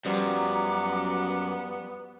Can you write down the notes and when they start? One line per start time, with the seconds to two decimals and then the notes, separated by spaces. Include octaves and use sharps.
0.06 F#2 F3 G3 B3 F#5 A#5 D6